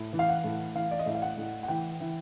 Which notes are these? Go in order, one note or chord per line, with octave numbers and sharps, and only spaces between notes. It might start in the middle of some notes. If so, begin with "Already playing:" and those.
Already playing: A2
E3
F5
F#5
A2
E3 F5
D5
D#5
A2 E5
F5
F#5
A2
F#5
E3 G5
E3